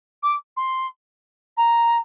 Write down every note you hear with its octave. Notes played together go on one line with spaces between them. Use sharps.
D6
C6
A#5